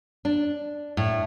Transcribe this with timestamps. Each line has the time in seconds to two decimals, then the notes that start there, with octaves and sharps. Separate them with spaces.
0.25 D4
0.97 A2